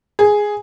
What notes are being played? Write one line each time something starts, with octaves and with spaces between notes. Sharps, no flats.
G#4